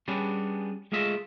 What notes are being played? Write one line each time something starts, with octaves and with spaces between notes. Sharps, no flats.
G3 B3 C#4 D4 G4 G#4
G#3 A3 F4 D#5 E5